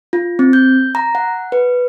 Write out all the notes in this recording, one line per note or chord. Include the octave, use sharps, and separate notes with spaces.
F4
C4
G6
A#5
F#5
B4